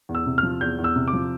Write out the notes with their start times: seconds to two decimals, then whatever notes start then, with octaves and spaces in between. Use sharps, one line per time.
0.09 E2
0.15 E6
0.26 C3
0.38 F6
0.43 F3
0.61 E2 G6
0.78 E2
0.84 E6
0.96 C3
1.08 D6
1.13 F3